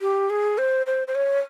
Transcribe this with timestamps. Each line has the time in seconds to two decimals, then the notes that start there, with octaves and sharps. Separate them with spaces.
0.01 G4
0.30 G#4
0.58 C5
0.86 C5
1.08 C5
1.15 C#5